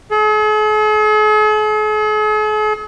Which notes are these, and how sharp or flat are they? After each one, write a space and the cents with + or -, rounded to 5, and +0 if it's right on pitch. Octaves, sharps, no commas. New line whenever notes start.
G#4 +45